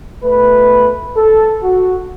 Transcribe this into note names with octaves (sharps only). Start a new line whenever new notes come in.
B2 A3 B4
A4
F#4